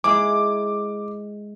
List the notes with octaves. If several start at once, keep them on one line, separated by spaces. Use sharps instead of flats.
G#3 E4 G#4 D6